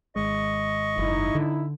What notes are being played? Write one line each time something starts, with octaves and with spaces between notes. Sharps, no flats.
G#1 G#3 D#5 C#6
F#1 D#4 E4
D3